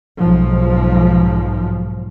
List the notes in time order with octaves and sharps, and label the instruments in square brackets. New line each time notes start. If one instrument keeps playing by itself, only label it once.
[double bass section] B1 G#2 F3